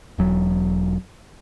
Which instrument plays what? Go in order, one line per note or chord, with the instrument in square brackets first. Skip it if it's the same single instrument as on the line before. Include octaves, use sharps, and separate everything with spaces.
[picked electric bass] E1 F#3